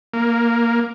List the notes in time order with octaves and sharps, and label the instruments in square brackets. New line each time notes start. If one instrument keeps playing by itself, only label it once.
[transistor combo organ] A#3